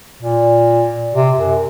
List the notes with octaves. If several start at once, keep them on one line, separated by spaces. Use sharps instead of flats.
A#2
C3
F#2